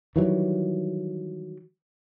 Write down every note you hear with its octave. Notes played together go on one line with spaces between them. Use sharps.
D#3 E3 F#3 G3